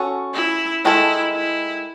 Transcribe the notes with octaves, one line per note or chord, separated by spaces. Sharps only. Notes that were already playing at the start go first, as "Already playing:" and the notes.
Already playing: C#4 F#4 A4 C#5
E4
D#3 G#3 D#4 E4 A4
E4